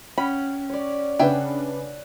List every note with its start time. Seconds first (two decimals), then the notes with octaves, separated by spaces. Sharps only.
0.18 C#4 F#5 G5 B5
0.70 C#5 D5
1.19 C#3 D4 G#4 B4 E5 F#5 G5